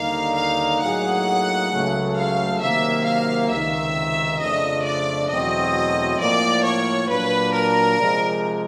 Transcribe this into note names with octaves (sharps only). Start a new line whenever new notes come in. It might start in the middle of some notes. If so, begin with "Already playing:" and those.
Already playing: D#2 D3 G3 A#3 D#4 F5
F5
A2 F#3 A#3 D#4 G#4 F#5
C#2 C#3 F#3 A3
F5
C3 D#3 F#3 A#3 E5
F5
C#2 C3 D#3 E5
F2 C#3 F3 A3 D4 D#5
D5
E2 B2 F#3 A3 C4 D#5
A2 F3 A#3 D5
C#5
A#2 F#3 A#3 D4 B4
A#4
C3 F3 G#3